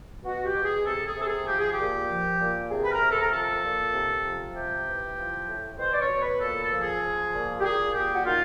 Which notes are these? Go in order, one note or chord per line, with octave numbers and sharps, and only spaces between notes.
B2 F#4
G4
B2
G#4
C3 A4
G#4
C3 A4
G#4
F3 G4
G#4
G4
A#2
F3
A#2
C3 G#4
B4
A#4
C3
A4
A#4
F3 A4
A#2
C3
F3
C3 G4
E3
F3
A2
B2 C5
D5
C#5
B2
B4
A#2 A4
A4
F3
G#4
F3
A#2
G4
A#2 G#4
A#2 G4
F#4
D#3 F4